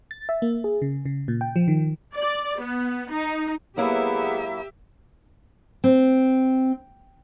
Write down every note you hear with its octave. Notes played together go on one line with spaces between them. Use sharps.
A6
E5
A#3
G#4
C#3
C#3
A#2
G5
F3
D#3
D5
B3
D#4
F#3 G#3 A#3 B3 E4 G4 E5
C4